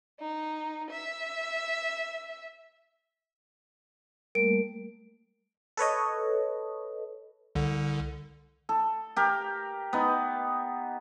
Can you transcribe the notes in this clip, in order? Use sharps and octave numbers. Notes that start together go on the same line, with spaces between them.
D#4
E5
G3 A3 A#3 A#4 D7
A4 B4 C#5 D#5
C2 D3
A4
G4 A#4
B3 D#4